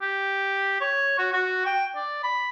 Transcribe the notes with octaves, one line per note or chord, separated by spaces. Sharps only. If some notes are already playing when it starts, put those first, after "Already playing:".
G4
C#5
F#4
F#4
G5
D5
B5